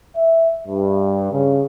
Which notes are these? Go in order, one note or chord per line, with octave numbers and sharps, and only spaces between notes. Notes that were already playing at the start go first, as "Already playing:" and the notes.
E5
G2
C#3